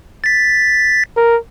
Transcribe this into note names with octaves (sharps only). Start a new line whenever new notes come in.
A6 B6
A#4